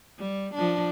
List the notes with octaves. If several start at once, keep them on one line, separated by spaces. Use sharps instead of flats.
G3
F3 D4